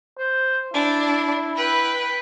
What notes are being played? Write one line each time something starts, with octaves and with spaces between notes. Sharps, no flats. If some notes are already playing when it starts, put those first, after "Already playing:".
C5
D4 E4
B4 G5